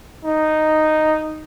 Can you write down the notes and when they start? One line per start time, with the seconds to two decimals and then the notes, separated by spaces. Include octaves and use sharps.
0.25 D#4